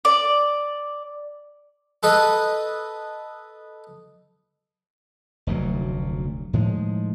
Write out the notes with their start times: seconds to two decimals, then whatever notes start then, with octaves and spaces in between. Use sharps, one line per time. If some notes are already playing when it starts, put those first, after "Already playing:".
0.05 D5
2.03 A4 B4 D#5
5.47 F1 D2 A#2 F#3
6.53 A2 D#3 F3 G#3